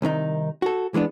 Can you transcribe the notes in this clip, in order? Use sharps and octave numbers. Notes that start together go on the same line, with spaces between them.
C2 C3 D#3 D#4
F#4 A4
E3 G#3 B3 D4